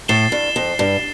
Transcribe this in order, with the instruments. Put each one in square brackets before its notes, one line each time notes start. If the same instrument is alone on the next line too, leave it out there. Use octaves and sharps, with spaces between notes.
[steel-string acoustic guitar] A2 [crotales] A6 C7 E7 G7
[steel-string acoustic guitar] G2
F2
G2